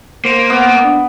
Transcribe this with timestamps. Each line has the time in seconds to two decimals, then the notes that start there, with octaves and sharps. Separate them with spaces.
0.25 A#3 C5
0.50 B3
0.84 D4